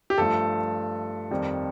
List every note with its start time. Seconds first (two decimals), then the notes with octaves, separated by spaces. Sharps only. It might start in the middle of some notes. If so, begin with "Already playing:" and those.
0.10 G4
0.18 G2 F3 A3 A4
1.31 F2 D#3 G3